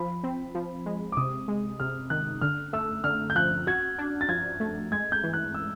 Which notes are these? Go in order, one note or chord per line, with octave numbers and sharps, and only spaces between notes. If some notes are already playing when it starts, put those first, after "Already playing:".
Already playing: F3 B5
C4
F3
G#3
D6
C3 D#6
G#3
C3 F6
D#3 F#6
D3 F6
A3 E6
D3 F6
G6
F3 F#6
F#4 G#6
D4
A6
F3 G#6
A3
G#3 G#6
G6
E3
F#6
E6